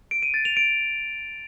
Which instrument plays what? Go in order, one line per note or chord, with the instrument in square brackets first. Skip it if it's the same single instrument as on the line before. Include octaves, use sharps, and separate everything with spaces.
[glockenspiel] D7
D#7
A6
F7
D7